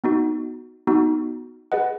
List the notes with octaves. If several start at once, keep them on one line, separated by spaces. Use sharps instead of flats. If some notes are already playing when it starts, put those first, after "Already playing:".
B3 D#4 F#4
B3 D#4 F#4
G#4 B4 D#5 F#5